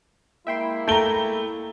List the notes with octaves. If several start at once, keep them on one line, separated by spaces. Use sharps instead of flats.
G#3 A#3 E4 E5 G5 C6
A3 G5 A#5 G7